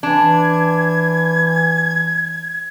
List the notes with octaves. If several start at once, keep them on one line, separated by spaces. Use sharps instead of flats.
E3 D4 G#6